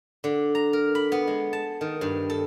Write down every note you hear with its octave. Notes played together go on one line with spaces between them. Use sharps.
D3
A#5
A#4
B5
B3
G#3
A5
D#3
G2
A4